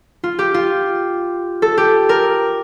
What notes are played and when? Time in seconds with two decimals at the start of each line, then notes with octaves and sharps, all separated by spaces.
0.23 F4
0.39 G4
0.54 F4
1.62 A4
1.78 G4
2.09 A#4